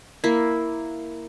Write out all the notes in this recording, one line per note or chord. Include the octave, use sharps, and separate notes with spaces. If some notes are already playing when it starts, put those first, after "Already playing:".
A#3 E4